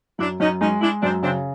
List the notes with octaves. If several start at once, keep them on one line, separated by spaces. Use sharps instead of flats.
F#2 D4 E4
F#2 C#4 D#4
G#3 C#4 D#4
G#3 D4 E4
F#2 C4 D4
C#3 C4 D4